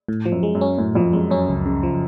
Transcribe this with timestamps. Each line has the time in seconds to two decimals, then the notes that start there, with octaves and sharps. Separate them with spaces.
0.08 A2
0.26 F3
0.32 F#2
0.43 G#3
0.55 F#2
0.61 C#4
0.78 F#2 A2
0.95 F2 F3
1.13 F#2 G#3
1.31 F#2 C#4
1.49 C#2
1.66 C#3
1.83 F3